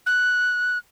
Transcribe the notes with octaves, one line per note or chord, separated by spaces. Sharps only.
F#6